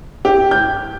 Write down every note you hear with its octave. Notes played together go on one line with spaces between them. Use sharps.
G4
G6